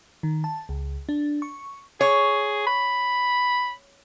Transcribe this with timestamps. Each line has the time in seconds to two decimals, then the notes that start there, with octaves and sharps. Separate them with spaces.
0.23 D#3
0.44 A5
0.69 C#2
1.09 D4
1.42 C#6
2.01 G#4 C#5
2.67 B5